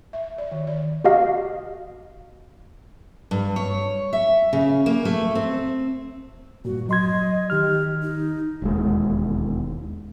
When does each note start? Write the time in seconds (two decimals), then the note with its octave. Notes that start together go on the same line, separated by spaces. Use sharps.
0.13 E5
0.38 D5
0.52 D#3
0.67 D5
1.04 F#4 G4 D#5 F5
3.31 G2
3.56 C#5
4.13 E5
4.53 C#3
4.86 A#3
5.05 A3
5.35 C4
6.65 G2 A#2 F#4
6.89 F#3 D#5 C6 G#6
7.50 D#3 G4 F6
8.02 D#4
8.62 E1 D#2 G#3